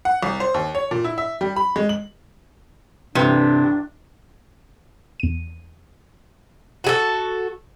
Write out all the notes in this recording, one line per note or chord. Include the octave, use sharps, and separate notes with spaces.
F#5
C2
C5
D#2
C#5
A#2
E4
E5
G3
B5
G#3
F#7
A1 G2 C3 D4 B4
E2 D#7
F#4 G#4 A4